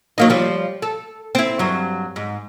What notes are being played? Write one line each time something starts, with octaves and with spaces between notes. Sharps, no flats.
F#3 A#3 D#4
F3 G3
A4
C4 E4
G2 F#3
G#2